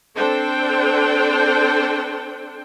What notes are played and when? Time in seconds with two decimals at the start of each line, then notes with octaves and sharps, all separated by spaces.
0.16 C4 D4 A4 C5 G5